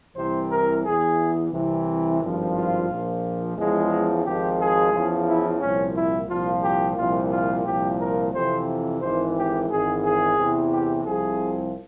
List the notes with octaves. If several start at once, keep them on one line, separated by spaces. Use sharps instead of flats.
C2 C3 E3 C5
A#4
E2 E3 G#4
C2 C3 E3
G#1 G2 F3
F4
A#1 A#2 F3
E2 C#3 F3 G#3
G#1 G#2 F3 G4
G#4
E2 C#3 F3
E4
C2 A#2 F3 C#4
E4
C2 A#2 F3 F4
G4
C2 A#2 F3 F4
F4
C2 A#2 F3 G4
A#4
F2 C3 E3 C5
G#1 G#2 E3 C5
G4
G#1 G#2 E3 G#4
G#4
E2 C3 E3
G4
C2 C3 F3 G#4